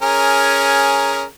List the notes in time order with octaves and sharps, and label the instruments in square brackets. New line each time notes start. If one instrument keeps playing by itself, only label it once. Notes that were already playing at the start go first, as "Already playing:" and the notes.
[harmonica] C#4 G#4 A#4